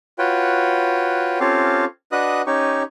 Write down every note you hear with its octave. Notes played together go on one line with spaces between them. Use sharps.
F4 F#4 B4 C#5 G5
C4 C#4 F4 G4 A4 F5
D4 F#4 B4 D#5 D#6 F#6
C#4 D#4 G4 C#6